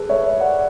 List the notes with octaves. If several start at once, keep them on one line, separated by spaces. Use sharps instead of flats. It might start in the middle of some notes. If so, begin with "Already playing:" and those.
Already playing: G#4 A4 B4
C#5 E5
D5 F#5